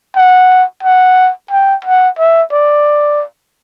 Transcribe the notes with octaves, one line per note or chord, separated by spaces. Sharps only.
F#5
F#5
G5
F#5
E5
D5